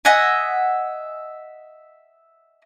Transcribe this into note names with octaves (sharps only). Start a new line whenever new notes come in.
D#5 E5 F#5 G#5